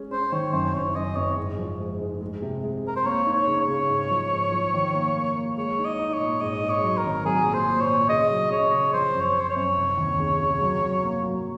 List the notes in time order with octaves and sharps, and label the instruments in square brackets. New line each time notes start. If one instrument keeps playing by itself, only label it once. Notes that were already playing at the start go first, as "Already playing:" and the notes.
Already playing: [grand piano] G#3 C#4
[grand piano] C#4 [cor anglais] C5
[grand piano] D#3 [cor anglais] C#5
[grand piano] F#2 [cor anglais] C5
[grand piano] F#1 [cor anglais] C#5
[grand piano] F#2 [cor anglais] D#5
[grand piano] F#1 [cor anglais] C#5
[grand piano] G#2
F3
G#3
G#2
G#3
C3
G#3
[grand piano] C4 [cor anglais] A#4
[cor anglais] C5
[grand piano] A#3 [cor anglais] C#5
[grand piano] D#4
[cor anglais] C#5
[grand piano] C#3
[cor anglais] C#5
[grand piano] C#3
G#2
F3
G#2
F3
D#3
A#3
A#3
A#3
[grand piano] G#3 [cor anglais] C#5
[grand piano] D#4
[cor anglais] D#5
[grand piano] D#4
[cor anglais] C#5
[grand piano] A#2
[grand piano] G#2 [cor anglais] D#5
[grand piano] G#2
[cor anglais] C#5
[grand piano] F#3
[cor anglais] A#4
[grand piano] G#1
[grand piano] F#3 [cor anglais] G#4
[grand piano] A#2
[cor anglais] C5
[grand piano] A#2
[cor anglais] C#5
[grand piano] A#2
[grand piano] C#3 [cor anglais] D#5
[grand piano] F#3
[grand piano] C#3 [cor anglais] C#5
[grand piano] C#3
[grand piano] F3 [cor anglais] C5
[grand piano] F#2
[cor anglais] C#5
[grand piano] C4 [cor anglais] C5
[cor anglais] C#5
[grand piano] F#2
F1
D#2
C#3
C#3
F#3
F#3
A#3
F#3